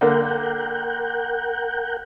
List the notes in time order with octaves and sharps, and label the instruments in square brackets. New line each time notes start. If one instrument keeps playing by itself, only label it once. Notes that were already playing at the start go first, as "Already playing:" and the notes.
[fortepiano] D3 A#3 [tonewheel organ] A#4 F#5 G5